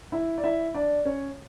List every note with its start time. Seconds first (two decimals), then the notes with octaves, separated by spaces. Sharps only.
0.12 E4 E5
0.38 D5
0.44 E4 E5
0.74 D4 D5
1.05 C#4 C#5